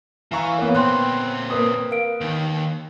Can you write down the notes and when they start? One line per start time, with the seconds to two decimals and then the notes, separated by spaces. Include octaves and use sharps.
0.32 E3 F5 A#5 C#6
0.58 A#3 B3 C#5 F5
0.75 A#2 C4 G5 C6 F#6
1.50 A#3 B4 D#6
1.91 A#4 F5 D7
2.21 D#2 D#3